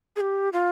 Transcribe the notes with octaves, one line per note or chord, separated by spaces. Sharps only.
G#4
G4
F4